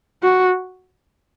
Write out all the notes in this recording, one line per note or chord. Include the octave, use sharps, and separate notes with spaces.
F#4